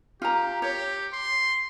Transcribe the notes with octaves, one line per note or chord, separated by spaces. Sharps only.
F4 G4 A#5
G4 C#5
C6